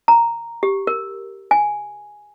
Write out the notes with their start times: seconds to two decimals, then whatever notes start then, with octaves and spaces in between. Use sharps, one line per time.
0.08 A#5
0.63 G4
0.87 A#4
1.51 G#5